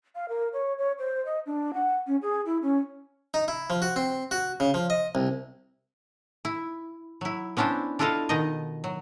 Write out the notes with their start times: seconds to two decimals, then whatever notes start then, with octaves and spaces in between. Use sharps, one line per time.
0.16 F5
0.29 A#4
0.53 C#5
0.79 C#5
0.99 C5
1.25 D#5
1.46 D4
1.74 F#5
2.07 C#4
2.22 G#4
2.46 E4
2.62 C#4
3.34 D#4
3.48 E4
3.70 F3
3.82 F#4
3.96 C4
4.31 F#4
4.60 C#3
4.74 F3
4.90 D#5
5.15 C2
6.45 E4
7.21 F#3 E4
7.57 B3 C#4 D4 E4 C5
7.99 D4 E4 F4 A4 D#5 F5
8.29 B2 D#3 D#4 D#5
8.84 F#3